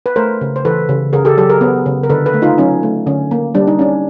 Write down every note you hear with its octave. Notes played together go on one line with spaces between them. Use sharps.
B4
A3 A#4 C5
C#3
C5
E3 A4 B4
C#3
C#3 G#4 A#4
G4 A4
F#3 G4 A4
G#4 A#4
B3
C#3
A#4
D3 A4 B4
A4 B4
A3
D#4 F4
F#3 C#4 D#4
A3
D3 C#4
A#3
G3 D4
D#4
C#4 D4